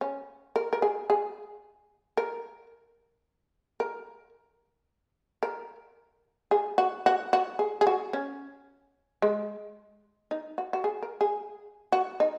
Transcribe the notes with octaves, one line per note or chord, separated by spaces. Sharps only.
C#4
A#4
A#4
G#4
G#4
A#4
A#4
A#4
G#4
F#4
F#4
F#4
G#4
G#4
F#4
C#4
G#3
D#4
F#4
F#4
G#4
A#4
G#4
F#4
D#4